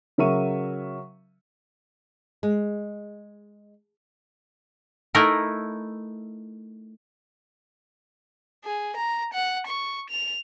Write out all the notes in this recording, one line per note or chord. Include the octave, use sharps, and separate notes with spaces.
C#3 F#3 A#4 E5 C#6 D#7
G#3
A3 D#4 E4 A#4
G#4
A#5
F#5
C#6
F7